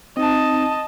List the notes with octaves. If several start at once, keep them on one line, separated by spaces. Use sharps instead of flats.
C4 D#4 D#5 A5